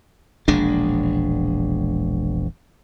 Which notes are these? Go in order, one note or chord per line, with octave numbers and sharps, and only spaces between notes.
E1 A#1 G#3 D4